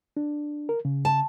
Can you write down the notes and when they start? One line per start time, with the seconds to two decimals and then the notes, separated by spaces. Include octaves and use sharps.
0.17 D4
0.69 A#4
0.85 C#3
1.05 A5